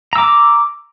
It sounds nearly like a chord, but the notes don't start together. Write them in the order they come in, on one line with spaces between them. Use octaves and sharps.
A#5 E6 D6